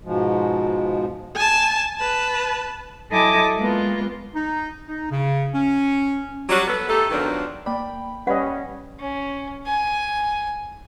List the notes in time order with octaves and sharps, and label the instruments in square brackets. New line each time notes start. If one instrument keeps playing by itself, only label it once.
[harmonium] G#2 B2 F3 G#3
[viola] G#5 A5
B4 A5
[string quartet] F#3 E4 A4 D#5 G#5 D6
G#3 A#3 B3 F4
[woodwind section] D#4
D#4
C#3
C#4
[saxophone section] F#3 G3
B3 A4
A3 D#4 G4 A4
D#3 F3 F#3 A#3 B3 D4
[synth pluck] A#3 G5 B5 [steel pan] D5
[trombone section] G3 C#4 [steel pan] B4 D#5 [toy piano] F#5
[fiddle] C#4
G#5